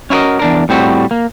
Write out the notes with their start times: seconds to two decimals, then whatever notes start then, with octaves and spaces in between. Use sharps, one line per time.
0.10 C#4 E4 F#4 A#4 D#5
0.39 E2 D4 A#4
0.69 A2 G3 C4 F#4
1.11 A#3